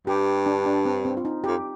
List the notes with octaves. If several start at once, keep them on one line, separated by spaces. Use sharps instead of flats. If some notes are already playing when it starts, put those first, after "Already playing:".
G2 G4
D4
D4
C4
C4
F4
D#4
G4
F2